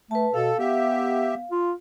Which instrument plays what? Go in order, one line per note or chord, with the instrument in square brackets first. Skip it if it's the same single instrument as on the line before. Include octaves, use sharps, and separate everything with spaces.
[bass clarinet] A3 [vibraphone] B4 A5
[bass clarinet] B2 [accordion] A4 [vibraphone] F5
[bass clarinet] B3 [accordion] G4 E5
[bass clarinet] F4